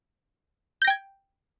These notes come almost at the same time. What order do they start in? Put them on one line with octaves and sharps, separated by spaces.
G6 A#6 G5 G#6